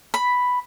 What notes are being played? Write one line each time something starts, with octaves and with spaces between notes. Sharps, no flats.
B5